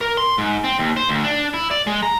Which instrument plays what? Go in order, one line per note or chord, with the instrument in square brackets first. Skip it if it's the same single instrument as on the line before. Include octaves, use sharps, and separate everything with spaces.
[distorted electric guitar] A#4
C6
G#2
C4
D#2
C5
D2
D4
E4
D5
G#3
A#5